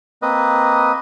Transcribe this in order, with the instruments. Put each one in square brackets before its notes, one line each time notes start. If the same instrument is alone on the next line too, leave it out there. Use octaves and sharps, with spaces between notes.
[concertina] A#3 C4 B4 D#5